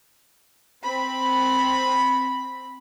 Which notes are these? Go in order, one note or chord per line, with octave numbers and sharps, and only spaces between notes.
C4 B5